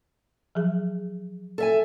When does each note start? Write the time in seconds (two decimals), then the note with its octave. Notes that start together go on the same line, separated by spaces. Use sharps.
0.55 F3 F#3 G#4
1.58 A4 E5 G#5